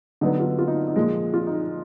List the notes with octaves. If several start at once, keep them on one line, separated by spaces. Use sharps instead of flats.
D3 F#3 B3 D#4
F4
F4
D#4
D#4
A#2 F3 G#3
F4
D#4